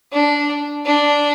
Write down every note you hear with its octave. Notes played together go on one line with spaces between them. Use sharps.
D4
D4